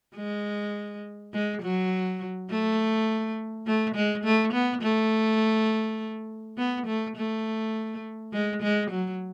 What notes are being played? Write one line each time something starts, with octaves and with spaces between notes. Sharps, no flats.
G#3
G#3
F#3
A3
A3
G#3
A3
B3
A3
B3
A3
A3
G#3
G#3
F#3